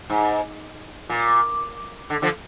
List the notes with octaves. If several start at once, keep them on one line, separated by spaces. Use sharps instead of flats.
G#2
A#2
D3
D3 F3